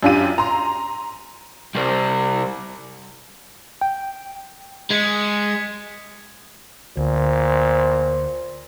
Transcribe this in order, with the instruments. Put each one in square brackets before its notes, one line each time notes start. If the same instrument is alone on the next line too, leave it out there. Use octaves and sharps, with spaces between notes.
[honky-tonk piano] F#2 D4 F4 G4 D#7
A#5 C6
[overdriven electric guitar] C2 G3
[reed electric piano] G5
[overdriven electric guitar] G#3 [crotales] G#6 B6 C#7
[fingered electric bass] D2 [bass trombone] A#2 [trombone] C5